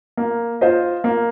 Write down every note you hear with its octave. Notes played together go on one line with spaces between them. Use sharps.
A#3
F4 C5 D#5
A#3